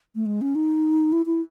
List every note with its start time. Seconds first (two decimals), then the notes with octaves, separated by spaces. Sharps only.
0.15 A3
0.26 G#3
0.41 C#4
0.55 D#4
1.12 E4
1.26 E4